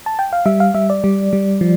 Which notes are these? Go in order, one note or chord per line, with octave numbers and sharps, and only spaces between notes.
A5
G5
F5
G3 E5
F5
G3 E5
D5
G3
G3
F3